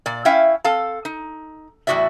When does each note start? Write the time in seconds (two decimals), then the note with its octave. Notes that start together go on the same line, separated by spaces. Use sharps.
0.06 A#2 D5
0.25 C#4 E4 E5 F5 G5
0.64 C4 A4 F5 A5
1.05 D#4
1.87 E2 A2 C4 F#4 D5 E5